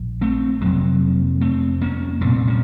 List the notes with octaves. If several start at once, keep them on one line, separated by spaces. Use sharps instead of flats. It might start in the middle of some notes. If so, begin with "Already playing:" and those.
Already playing: A#1
A3 C4
F1 F2 C3 F#3 A#3
A3 C4
A#3 C#4
C2 A#2 A3 C4
A#3 C#4